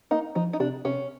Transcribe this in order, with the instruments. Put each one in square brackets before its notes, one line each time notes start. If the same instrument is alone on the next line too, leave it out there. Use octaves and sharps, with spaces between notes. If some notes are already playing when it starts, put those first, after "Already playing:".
[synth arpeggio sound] A#3 [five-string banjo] D#4
[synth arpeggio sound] F3 [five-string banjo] D#4
[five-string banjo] D#4
[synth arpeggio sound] C3 [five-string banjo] D4
[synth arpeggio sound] C3 [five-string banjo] C#4